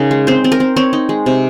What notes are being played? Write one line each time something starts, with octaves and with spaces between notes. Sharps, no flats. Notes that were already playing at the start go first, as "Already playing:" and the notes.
Already playing: C#3 D#4 A#4
G#3
C4 C5
C4
A#4
C4
C4 C#5
D#4
G#3
C3